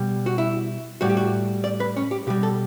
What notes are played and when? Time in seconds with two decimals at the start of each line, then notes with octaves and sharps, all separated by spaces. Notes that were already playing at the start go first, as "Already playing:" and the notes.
Already playing: B2 G3
0.26 F#4
0.38 E4
1.01 A2 G3 F#4
1.09 G4
1.17 F#4
1.64 D5
1.80 B4
1.97 C#4
2.11 G4
2.27 B2 G3 G4
2.43 A4